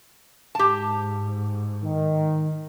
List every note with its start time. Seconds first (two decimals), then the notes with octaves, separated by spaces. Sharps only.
0.55 G#2 G4 A5
1.83 D#3